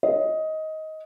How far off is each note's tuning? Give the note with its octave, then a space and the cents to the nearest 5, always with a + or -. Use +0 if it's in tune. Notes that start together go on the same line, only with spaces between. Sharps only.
D#5 +15